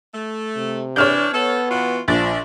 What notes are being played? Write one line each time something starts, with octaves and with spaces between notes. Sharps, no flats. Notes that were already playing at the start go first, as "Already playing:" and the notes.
A3
C3
E3 D4 C#5 F6 G6
B3 A4
E3 F4 F#4
A#1 F3 D4 A6